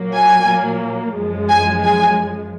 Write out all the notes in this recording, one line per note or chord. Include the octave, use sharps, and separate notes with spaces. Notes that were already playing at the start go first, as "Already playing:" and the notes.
Already playing: A#2 F#3 A#3
G#5
F#2 F3 G#3
G#5
G#5